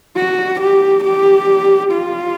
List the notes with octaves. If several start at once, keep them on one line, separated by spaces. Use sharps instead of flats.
F#4
G4
G4
F4